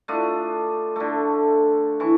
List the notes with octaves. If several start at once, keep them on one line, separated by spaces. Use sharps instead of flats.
A3 D4 F4 D#5
D3 A3
E3 C#6